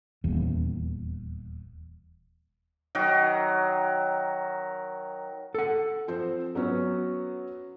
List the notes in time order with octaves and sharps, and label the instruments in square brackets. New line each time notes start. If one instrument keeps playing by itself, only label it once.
[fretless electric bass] D#1 E2
[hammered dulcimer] D#3 F#3 A#4
[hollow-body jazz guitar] A4 F#5
[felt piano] F3 C4 C5
F#3 B3 C#4